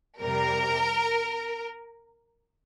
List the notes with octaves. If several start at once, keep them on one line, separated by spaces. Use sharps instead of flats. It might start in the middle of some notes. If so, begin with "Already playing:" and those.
F2 C3 G3 A#4